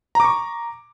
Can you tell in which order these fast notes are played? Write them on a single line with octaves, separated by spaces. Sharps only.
A#5 D6 C#6